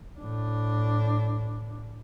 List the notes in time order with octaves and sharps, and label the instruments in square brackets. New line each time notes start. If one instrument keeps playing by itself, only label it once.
[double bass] A2 D4